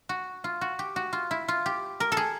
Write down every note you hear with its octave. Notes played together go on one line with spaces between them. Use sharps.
F#4
F4
F#4
G4
F#4
F4
E4
F4
G4
A#4
A4
G#4